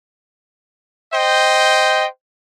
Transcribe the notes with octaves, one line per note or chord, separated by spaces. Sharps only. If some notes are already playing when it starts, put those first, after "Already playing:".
C5 D#5 G5